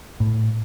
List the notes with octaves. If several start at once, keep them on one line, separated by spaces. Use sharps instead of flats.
A2